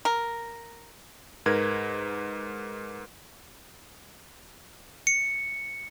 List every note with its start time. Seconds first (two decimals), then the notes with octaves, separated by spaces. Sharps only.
0.05 A#4
1.46 G#2 A#4 B4 G#6
5.07 C#7